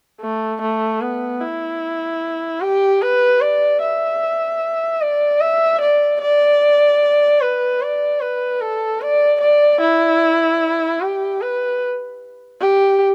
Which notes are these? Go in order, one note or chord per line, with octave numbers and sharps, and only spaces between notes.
A3
A3
B3
E4
G4
B4
D5
E5
D5
E5
D5
D5
B4
D5
B4
A4
D5
D5
E4
G4
B4
G4